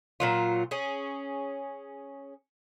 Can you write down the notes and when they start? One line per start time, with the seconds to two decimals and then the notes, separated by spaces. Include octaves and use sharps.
0.20 A#2 F#3 F4
0.71 C#4 G#4